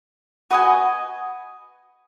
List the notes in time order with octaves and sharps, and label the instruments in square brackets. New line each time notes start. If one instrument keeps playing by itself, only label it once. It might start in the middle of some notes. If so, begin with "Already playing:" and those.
[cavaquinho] F#4 B4 D#5 G#5